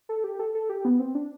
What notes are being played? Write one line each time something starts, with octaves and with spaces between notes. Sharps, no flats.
A4
G4
A4
A4
G4
B3
C4
D4